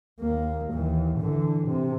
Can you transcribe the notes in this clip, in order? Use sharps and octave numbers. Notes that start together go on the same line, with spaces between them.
D#2 A#3
D#2 E3
D3 E3
C3